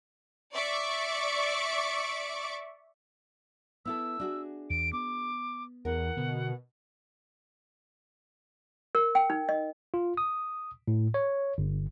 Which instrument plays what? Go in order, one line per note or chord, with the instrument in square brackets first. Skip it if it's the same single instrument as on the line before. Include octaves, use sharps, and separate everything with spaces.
[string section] D5 E5 C#6 D6
[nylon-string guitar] B3 E4 A4 [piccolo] E6
[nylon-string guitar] D4 F#4 G#4
[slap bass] E2 [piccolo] D7
[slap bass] B3 [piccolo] D6
[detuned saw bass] E2 [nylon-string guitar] A#4 [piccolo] F#5
[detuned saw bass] B2 [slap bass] D3
[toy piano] A#4
G5
D#4
D#5
[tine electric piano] F4
D#6
A2
C#5
G1